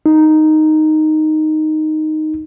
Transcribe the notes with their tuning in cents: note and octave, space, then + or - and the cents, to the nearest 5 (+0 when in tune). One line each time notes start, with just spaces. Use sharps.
D#4 -5